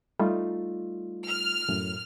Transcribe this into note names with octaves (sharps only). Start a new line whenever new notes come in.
G3 A3 D#4 F4
F6
F#2 A2